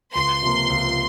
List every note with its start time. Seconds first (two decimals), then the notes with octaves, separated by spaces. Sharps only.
0.15 C#2 C6
0.42 C3 F3 A#3
0.70 C#2